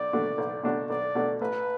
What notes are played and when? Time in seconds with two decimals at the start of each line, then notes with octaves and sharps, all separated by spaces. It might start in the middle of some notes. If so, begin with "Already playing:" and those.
Already playing: B1 D5
0.13 B2 A3 D4 F#4
0.38 B1
0.63 B2 A3 D4 F#4
0.90 B1 D5
1.15 B2 A3 D4 F#4
1.41 A1 B4